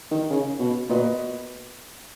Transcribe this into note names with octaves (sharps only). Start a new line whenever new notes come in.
D#3
C#3
B2
A#2 B3 F#4 B4 D#5